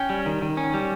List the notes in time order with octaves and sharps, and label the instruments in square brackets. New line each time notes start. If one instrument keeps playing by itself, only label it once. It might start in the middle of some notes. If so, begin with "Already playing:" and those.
Already playing: [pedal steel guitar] C#4 G5
G3
D#3
D#3
C#4
G3